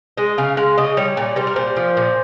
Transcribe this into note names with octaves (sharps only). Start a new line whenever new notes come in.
G#3 D#5
C#3 F5
G#3 F5
C#3 D#5
G3 C#5
A#2
G3 C5
A#4
A#2 C5
F3
A#2